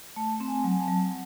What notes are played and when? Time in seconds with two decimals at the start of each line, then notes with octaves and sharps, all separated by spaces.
0.16 A3 A5
0.40 C4
0.48 G#5
0.64 F#3
0.80 A5
0.88 F#3